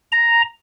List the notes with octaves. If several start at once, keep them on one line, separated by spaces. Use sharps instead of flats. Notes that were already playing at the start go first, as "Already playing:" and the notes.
A#5